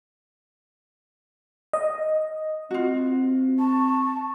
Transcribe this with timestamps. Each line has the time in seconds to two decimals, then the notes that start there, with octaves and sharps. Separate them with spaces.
1.73 D#5
2.71 C4 F4 F#4
3.59 A5 C#6